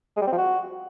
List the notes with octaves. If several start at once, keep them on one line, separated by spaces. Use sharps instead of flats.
G#3
G3
C4
F3
F#4